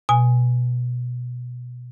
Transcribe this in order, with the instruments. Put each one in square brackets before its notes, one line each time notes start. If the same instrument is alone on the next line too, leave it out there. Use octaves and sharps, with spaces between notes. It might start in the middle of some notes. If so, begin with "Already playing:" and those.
[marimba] B2 G#5